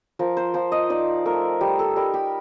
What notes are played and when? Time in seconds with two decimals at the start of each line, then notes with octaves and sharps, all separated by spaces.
0.19 F3 A#4
0.37 C5
0.54 F3 C5
0.72 D#5
0.90 D#4 D5
1.25 A3 A#4
1.61 G3 G4
1.79 A4
1.96 G3 A#4
2.14 G4